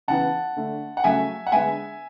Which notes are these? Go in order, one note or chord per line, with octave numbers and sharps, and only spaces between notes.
C#3 E3 B3 F#5 A5
D3 A3
F#5
C#3 F#3 A3 E5 G#5
F#5
D3 G#3 B3 E5 G#5